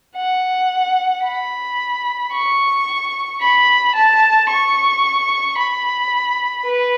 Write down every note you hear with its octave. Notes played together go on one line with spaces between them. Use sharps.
F#5
B5
C#6
B5
A5
C#6
B5
B4